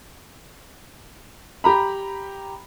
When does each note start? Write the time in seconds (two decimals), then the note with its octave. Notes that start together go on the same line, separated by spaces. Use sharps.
1.64 G4 A#5 B5